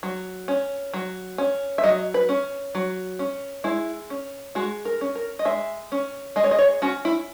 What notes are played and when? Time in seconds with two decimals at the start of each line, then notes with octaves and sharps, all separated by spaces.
0.03 F#3
0.48 C#4
0.94 F#3
1.38 C#4
1.78 E5
1.84 F#3 D#5
2.14 B4
2.29 C#4
2.75 F#3
3.19 C#4
3.64 G#3 E4
4.10 C#4
4.55 G#3 F#4
4.85 A#4
5.01 C#4
5.15 A#4
5.39 D#5
5.45 G#3 E5
5.92 C#4
6.36 G#3 D#5
6.44 C#5
6.51 D#5
6.59 C#5
6.82 C#4 F#4
7.05 E4